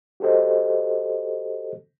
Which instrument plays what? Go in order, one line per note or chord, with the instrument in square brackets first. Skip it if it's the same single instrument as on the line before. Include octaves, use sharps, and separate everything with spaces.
[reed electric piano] F#4 G4 A4 C5 D#5